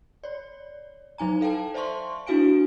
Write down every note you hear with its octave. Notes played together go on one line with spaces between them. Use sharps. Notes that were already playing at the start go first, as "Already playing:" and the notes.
C#5 D5
F#3 D#4 G#5 A#5
A4 F5 G5 A5
C5 D5 E5 A5 C6 C#6
D4 E4 F#4 F5 G#5 D7